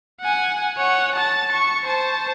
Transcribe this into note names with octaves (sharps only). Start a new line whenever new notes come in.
F#5 G#5
C#5 F#5
A5 A6
C#6
C5 A5